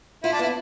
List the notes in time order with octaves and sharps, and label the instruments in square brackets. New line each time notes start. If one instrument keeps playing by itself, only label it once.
[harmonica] E4 [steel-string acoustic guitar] F4
[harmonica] D4
[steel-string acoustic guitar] B3 [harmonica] E4